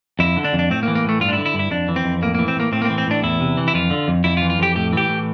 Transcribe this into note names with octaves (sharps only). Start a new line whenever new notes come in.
F2 E4
D3
D4
F2
D4
A2 C4
A#3
E3
A#3
A2 A3
G2 F4
D4
E4
D3
E4
G2
E4
F2 D4
E3
C4
F2
A2 A#3
A#3
E3
C4
A2 A#3
A2 C4
A#3
C4
E3
C4
A2 D4
E2 E4
C3
E3
E4
F2 F4
D3
F2
F2 E4
F4
E3
F4
F2 G4
A2 G4
E3 G4
A2